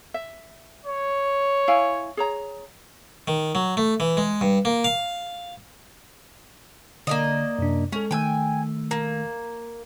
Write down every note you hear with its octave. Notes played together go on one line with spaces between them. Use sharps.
E5
C#5
E4 F5 G#5
G#4 C#5 A#5
D#3
F#3
A3
E3
G#3
G2
A#3
F5
D3 A#3 D5 D#5
F#2 C3 D4
G#3 C#4 A4
D#3 A3 G5 G#5 E6
A#3